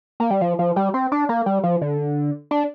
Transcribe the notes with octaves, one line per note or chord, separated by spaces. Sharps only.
A#3
G3
F3
F3
G3
C4
D4
A#3
G3
F3
D3
D4